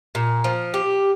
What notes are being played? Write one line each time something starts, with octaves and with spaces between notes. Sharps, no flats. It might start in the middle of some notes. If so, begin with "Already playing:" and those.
A#2
F3
G4